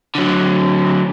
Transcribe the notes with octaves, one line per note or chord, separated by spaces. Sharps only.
D3 F#3